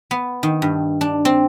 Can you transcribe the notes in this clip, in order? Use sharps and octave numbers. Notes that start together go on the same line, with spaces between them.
B3
D#3
G2
D4
C4